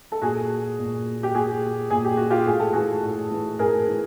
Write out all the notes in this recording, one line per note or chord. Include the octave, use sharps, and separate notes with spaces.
A4
A#2 F#4 G#4
A#2
G4
A#2 F#4 G#4
A#2 G#4
G4
F#4
F4 G4
A2 G#4
A4
E3 F#4 G#4
A2
E3
A2 G#4 A#4
E3